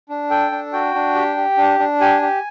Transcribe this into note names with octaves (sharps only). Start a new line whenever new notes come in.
D4
A4 G5
D4
F#4 G5
D4
G4
G4
D4
D4
G4 G#5
G4